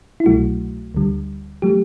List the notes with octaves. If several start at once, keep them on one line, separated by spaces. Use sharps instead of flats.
E4
C2 B2 F#3 A3 F#4
D2 D3 G3
F#3 A3 G4